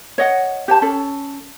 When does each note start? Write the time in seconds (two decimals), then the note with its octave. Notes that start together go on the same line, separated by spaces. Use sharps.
0.18 C#5 D#5 F#5
0.68 G4 C5 A5
0.82 C#4 A4